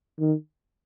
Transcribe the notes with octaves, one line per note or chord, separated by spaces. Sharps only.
D#3